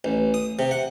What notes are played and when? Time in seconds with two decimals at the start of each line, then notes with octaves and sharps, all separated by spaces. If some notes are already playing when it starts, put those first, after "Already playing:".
0.04 A1
0.34 D#6
0.59 C3
0.71 F#5